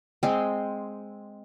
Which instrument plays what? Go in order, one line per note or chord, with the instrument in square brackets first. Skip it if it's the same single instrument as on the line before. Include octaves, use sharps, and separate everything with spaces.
[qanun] G#3 C4